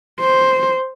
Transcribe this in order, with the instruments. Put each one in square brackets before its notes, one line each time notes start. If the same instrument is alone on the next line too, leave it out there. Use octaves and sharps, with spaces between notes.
[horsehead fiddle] C5